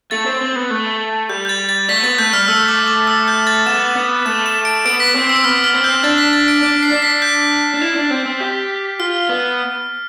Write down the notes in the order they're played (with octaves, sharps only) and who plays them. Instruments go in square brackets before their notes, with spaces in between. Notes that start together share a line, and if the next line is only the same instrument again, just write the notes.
[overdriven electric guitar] A3 [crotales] A6
[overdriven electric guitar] C4
C4
B3
A3
[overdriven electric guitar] G3 [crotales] G6
[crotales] G6
A6
A6
[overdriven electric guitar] A3 [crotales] B6
[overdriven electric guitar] B3 [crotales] A6
[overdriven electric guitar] A3 [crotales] G6
[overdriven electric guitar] G3 [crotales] F6
[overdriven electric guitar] A3 [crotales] E6
[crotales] D6
D6
E6
G6
A6
[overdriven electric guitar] B3 [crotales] E7
[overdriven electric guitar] B3
[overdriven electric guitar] A3 [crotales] E7
[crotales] E7
D7
[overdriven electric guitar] B3 [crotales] D7
[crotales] B6
[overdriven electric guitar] C4
[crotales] E6
[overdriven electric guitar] B3 [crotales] F6
[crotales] F6
[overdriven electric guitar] C4
[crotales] G6
[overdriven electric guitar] D4 [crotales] A6
[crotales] B6
A6
D7
[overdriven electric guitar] D4 [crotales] D7
[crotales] C7
[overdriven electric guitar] D4
[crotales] B6
G6
[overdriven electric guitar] D4
E4
D4
C4
C4
G4
[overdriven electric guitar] F4 [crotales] F6
[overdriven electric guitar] B3